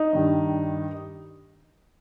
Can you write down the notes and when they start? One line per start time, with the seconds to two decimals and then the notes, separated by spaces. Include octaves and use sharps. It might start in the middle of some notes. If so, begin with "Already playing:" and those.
Already playing: D#4
0.13 G2 D#3 G3